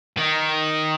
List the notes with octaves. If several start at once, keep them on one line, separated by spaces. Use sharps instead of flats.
D#3